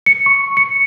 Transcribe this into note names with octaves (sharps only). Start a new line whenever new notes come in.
C#7
C#6
C#7